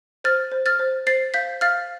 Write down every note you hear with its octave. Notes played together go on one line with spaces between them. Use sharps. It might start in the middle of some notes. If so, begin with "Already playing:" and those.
C5 F6 A6
C5
F6 A6
C5
C5 A6 C7
F5 G6 B6
F5 F6 A6